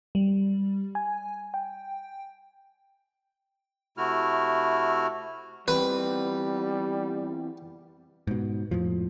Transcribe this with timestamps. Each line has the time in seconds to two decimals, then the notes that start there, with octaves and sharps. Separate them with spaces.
0.15 G3
0.95 G#5
1.54 G5
3.97 C3 A3 E4 F#4 F6
5.68 E2 G3 C4 B4
8.27 G#2 B2
8.71 F2 A2 F3